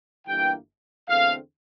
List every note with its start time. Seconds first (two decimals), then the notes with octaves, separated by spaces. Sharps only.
0.27 G1 G2 E3 A#3 G5
1.09 E2 D3 A3 C4 F5